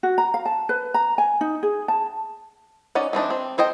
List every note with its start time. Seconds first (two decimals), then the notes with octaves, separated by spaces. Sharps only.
0.03 F#4
0.18 A#5
0.34 F5
0.45 A5
0.69 B4
0.94 A#5
1.18 G#5
1.41 D#4
1.63 G#4
1.88 A5
2.95 C#4 D#4 D5 F#5
3.13 E3 C4 D4 D#4
3.30 C4
3.58 A4 C5 D#5 G5